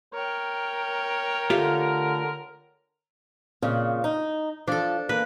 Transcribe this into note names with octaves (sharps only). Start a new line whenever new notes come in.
A#4 C#5 G5
D3 A3 F4 G4
F2 A#2 C#3
D#4
F3 D4 A4
A#3 B4